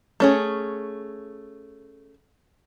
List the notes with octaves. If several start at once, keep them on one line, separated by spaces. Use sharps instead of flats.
A3 C#4 G#4